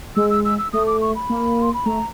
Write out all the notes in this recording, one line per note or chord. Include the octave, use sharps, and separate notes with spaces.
G#3 E6
E6
E6
E6
A3 D#6
D6
C#6
B5
A#3
C6
B5
A3 A#5